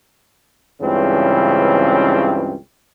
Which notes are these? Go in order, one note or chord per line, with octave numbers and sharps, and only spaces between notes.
C#2 G2 C#3 E3 C4 C#4